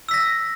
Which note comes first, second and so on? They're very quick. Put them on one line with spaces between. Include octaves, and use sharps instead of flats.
E6 B6 A#6